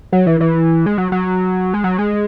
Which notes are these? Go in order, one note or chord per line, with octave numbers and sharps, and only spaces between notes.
F#3
E3
E3
G#3
F#3
F#3
G#3
F#3
G#3